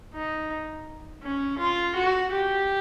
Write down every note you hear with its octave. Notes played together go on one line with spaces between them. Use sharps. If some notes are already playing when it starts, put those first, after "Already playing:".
D#4
C#4
F4
F#4
G4